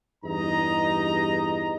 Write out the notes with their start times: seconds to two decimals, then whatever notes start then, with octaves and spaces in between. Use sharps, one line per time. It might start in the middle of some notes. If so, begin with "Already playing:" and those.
0.23 E2 G2 D#4 D#5 A#5